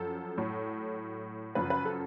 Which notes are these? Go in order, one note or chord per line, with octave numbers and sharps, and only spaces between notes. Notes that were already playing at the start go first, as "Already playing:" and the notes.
Already playing: F#2 F3 A4
A2 F#3
F#2 C#3 F3 B4
B4
A4